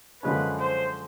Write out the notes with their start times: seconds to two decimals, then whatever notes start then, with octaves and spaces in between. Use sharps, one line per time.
0.23 F#2 D3 F3 G#3 C#4 B4
0.60 C5